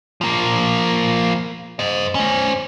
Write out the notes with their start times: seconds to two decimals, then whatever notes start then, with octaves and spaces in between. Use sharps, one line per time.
0.21 F3 A#3
1.79 C5 D#5
2.15 C#4 C5